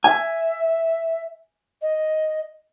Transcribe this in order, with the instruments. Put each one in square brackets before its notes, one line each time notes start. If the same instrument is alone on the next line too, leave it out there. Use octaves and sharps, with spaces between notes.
[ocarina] E5 [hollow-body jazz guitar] G#5
[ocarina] D#5